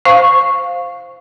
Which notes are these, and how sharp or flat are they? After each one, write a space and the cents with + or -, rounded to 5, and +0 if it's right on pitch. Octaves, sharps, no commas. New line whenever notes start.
C5 +0 F5 +5 C#6 -5